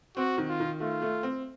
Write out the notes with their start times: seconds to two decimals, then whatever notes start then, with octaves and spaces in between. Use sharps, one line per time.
0.16 C4 F#4
0.38 D#3
0.49 F4
0.60 D#3
0.80 A3 F4
1.02 A3
1.23 C4